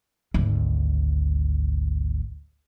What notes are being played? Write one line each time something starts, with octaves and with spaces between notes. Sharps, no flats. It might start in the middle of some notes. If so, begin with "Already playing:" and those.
G#1 D2